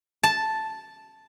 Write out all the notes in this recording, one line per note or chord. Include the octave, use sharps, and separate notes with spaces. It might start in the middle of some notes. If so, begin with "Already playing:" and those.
A5